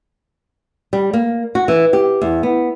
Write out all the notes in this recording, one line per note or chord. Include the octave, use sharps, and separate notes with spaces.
G3
A#3
F#4
E3
G4
E2
B3